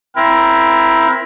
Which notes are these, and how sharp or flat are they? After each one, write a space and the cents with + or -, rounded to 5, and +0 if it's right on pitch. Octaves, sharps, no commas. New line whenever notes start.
C4 +0 E4 +10 A#4 +20